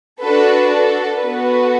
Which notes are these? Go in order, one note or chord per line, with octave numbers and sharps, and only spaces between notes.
D4 F#4 A4 B4
A4
B3 F#4 A4 B4